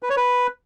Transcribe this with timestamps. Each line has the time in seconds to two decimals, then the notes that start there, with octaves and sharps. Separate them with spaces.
0.03 B4
0.10 C#5
0.17 B4